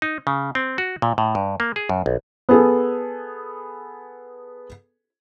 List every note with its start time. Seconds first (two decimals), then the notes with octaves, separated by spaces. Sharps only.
0.02 D#4
0.27 C#3
0.55 C4
0.78 F#4
1.02 A#2
1.18 A2
1.35 G2
1.60 A#3
1.76 G#4
1.89 F#2
2.06 B1
2.49 B3 G#4 A4